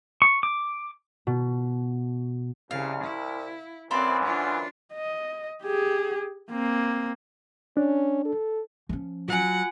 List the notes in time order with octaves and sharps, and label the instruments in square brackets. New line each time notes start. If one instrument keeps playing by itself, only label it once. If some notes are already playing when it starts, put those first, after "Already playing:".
[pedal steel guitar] C#6
D6
[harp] B2
[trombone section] C2 [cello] C#3 [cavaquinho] F5
[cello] E4
[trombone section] F#2 E3 [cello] C4 D5 [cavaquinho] C5 F5 B5
[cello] D4 F4
[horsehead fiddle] D#5
G4 G#4
A#3 C4
[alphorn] C#4 [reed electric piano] D4
[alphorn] A4
[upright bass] F3 C#4
[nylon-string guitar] F#3 [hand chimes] F4 G#5 [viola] F#5